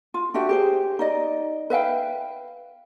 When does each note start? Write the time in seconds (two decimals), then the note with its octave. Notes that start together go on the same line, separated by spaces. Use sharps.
0.14 F4
0.34 D4 F#4 G4 E5
0.49 G4 G#4 C5
0.99 D#4 D5 D#5
1.70 B4 E5 F5 G5